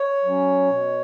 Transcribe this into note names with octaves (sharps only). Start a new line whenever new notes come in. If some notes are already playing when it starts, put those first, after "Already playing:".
Already playing: C#5
F#3 C#4
B2